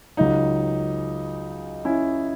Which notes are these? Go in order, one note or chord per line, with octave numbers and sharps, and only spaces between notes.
C#2 C#3 F#3 D#4
C#4 E4